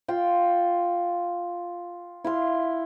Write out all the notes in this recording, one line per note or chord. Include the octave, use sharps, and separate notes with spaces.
F4 G5 C6
E4 F5 C6